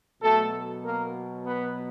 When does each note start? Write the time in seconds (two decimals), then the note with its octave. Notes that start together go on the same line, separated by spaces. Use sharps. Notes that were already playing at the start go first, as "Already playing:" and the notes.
0.21 B2 F#3 A3 A4
0.83 A#3 A#4
1.45 B3 B4